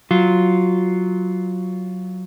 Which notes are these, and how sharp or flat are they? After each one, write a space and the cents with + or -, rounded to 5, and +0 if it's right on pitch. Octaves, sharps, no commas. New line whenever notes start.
F#3 +0 F4 +0